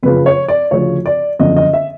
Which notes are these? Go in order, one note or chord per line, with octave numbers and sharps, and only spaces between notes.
F#1 F2 C#3 F3 B4
C#5
D5
D2 C#3 F3 C#5
D5
F#1 F2 D3 D#5
D#5
E5